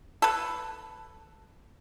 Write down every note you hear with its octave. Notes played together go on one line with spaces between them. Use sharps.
A4 B4